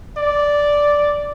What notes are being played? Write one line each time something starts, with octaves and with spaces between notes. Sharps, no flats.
D5